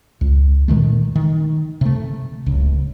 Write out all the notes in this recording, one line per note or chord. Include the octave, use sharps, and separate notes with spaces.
C#2
A#2 D#3 G#3 A3
D#3
C3 A3
D1 C#2